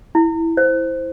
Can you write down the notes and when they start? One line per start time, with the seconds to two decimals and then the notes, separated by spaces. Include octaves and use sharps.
0.15 E4
0.57 C5